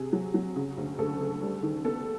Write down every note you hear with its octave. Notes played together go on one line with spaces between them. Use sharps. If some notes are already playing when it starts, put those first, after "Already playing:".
Already playing: C3 G#4
F#3
F#3
C#3
D2
D2 A4
C#3
G3
D#3
B3 A4